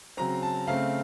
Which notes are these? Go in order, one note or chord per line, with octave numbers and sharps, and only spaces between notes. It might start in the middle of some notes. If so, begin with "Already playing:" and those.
C#3 F#3 C4 A#5
A5
C#3 A3 C4 F5